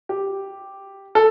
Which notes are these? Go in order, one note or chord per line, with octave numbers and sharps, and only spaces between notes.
G4
A4